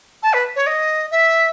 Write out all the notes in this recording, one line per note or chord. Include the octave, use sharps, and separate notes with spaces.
A5
B4
C#5
D#5
E5